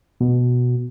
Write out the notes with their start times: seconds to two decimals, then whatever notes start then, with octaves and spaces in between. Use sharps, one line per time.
0.20 B2